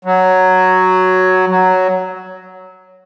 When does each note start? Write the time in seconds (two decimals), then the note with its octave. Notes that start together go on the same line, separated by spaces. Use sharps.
0.05 F#3
1.50 F#3